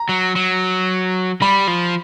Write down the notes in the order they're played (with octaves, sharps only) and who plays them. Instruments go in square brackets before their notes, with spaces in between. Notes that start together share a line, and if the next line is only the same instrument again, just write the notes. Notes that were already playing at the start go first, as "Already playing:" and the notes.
Already playing: [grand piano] A#5
[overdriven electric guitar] F#3
F#3
[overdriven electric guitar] G3 [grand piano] B5
[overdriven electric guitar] F3